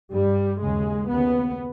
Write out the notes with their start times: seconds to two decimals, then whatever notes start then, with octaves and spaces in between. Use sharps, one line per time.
0.12 G2 G3
0.61 D#2 C#3 G#3
1.10 D#2 C#3 B3